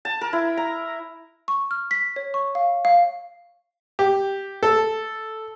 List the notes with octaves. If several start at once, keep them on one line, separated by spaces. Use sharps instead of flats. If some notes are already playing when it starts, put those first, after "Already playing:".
A5
A#4
E4
A#5
C#6
F6
B6
C#5
C#6
F5
F5
G4
A4